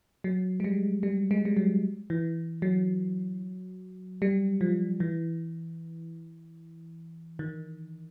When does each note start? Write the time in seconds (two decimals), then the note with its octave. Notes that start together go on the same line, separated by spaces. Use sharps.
0.24 F#3
0.60 G#3
0.64 G3
1.03 G3
1.31 G#3
1.45 G3
1.57 F#3
2.10 E3
2.62 F#3
4.22 G3
4.61 F3
5.00 E3
7.39 D#3